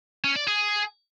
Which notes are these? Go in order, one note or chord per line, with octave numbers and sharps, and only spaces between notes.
C#4
D5
G#4